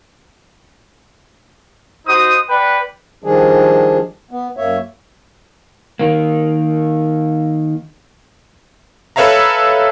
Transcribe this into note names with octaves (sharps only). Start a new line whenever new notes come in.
D#4 F#4 C5 D#6
B4 D5 F#5 G5 B5
D#3 F3 G3 D4 G#4
B3
F#2 A#3 C#5 E5
D#3 A#3
A4 B4 C#5 E5 F5 A#5